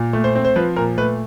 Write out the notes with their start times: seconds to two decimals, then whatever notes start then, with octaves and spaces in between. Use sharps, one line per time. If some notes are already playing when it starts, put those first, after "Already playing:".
Already playing: A#2
0.13 A3
0.24 C5
0.35 C4
0.45 C5
0.56 F3 B4
0.76 A#2 A#4
0.98 A3 B4